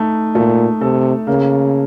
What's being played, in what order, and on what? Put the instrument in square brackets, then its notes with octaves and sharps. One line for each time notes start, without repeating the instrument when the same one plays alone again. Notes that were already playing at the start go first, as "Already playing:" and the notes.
Already playing: [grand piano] A3 D#4
[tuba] A#2 [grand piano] A3
[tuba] C3 [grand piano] A4
[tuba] C#3 [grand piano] A#3